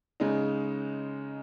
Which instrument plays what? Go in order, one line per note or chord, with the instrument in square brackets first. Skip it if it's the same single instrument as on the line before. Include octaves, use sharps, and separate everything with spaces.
[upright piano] C#3 G#3 D#4